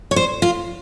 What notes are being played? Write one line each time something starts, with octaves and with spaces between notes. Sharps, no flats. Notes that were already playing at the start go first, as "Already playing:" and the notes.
C#5
C5
F4